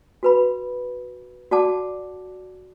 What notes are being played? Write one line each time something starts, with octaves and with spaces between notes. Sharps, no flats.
F#4 B4 B5
F#4 D5 F#5 A5 D6